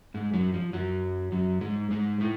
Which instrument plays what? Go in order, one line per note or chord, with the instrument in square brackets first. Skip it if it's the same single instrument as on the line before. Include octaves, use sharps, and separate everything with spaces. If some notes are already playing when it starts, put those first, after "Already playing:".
[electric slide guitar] G#2 G#3
F#2 F#3
F3
F#2 F#3
F#2 F#3
G#2 G#3
G#2 G#3
A2 A3